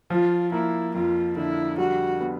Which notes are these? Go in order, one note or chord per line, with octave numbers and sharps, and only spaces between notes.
F3 F4
A#3 E4
F2 F4
D3 E4
G3 F#4
B3